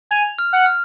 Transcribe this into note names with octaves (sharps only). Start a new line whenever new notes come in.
G#5 F7
F6
F#5
F6